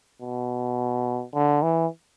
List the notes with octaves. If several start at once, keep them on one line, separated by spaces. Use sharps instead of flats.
B2
D3
E3